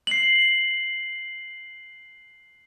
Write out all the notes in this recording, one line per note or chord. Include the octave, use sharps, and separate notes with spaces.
C7 F#7